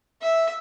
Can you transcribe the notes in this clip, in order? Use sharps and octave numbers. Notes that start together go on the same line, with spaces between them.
E5